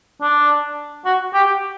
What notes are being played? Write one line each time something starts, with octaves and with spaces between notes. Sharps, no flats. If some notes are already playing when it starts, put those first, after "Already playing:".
D4
F#4
G4